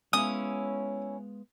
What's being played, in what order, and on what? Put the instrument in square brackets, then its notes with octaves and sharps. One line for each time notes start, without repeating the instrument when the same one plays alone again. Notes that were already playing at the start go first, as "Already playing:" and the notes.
[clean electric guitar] G#3 B3 F5 [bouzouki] C#4 E4 [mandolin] D#6